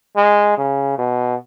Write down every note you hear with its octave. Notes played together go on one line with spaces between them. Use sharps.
G#3
C#3
B2